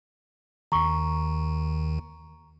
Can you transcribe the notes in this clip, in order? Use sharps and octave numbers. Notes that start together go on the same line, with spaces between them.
D#2 D#3 A#5 C#6